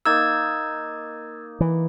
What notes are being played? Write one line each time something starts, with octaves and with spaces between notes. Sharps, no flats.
A#3 D#4 E6 G#6 A6
E3